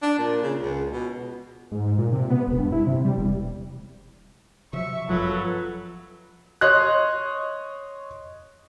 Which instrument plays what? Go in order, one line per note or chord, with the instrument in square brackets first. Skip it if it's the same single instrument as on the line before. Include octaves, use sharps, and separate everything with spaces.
[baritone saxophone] D4
A#2
C#3
C#2
B2
[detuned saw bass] G#2
A#2
C3
B3
E1
G2
E4
C3
G3
E1
[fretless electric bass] C3 F3 F#3 [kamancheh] E5 C#6
[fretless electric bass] G1 F#2 [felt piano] F3 [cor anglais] F#3 [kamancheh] A4 B4
[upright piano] C#5 D#5 C6 F#6